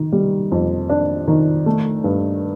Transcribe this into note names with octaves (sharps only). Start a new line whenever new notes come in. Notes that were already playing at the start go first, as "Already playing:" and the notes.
Already playing: D#3
G3
F2
D4
D#3
A3
G2